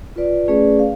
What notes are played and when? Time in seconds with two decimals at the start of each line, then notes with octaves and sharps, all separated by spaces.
0.16 F4 B4 D5
0.48 A3 C#4 G#4 B4 D5
0.79 F5